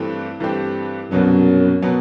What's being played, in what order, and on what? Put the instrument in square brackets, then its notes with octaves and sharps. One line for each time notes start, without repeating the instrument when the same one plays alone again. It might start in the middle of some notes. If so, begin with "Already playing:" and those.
Already playing: [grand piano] G2 E3 A3 C4 G4
G2 E3 A3 C4 G4
[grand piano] C2 B2 F#3 B3 [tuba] F#2
[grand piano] B2 F#3 B3